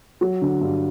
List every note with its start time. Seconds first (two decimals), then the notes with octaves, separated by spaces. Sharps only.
0.21 F#3
0.42 D3
0.61 G2